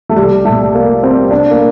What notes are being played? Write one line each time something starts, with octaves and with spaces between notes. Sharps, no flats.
A3
C2 G3
A#2 G3 A3
C2 A#3
A#2 G3 C4
C2 D4
A#3